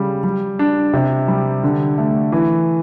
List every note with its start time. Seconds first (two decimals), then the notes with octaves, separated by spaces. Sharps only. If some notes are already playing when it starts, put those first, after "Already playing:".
Already playing: C#3 G3
0.24 G3
0.59 D4
0.94 C3
1.28 G3
1.63 D3
1.98 A3
2.32 E3